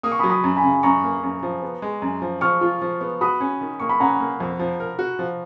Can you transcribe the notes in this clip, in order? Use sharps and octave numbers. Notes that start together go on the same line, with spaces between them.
A#3 D#6
C#6
B5 D#6
F#3
B5 D#6
F#2
G#5 B5
C#3
F#2 A#5 C#6
A#3
F#2
F3
B3
G#3
F#2
F3
F3 C#6 F6
F4
F3
B3
F#4 B5 D#6
C#4
D#3
A#3 C#6
B5
C#4 F#5 A#5
A#3
F2
F3
A#4
F#4
F3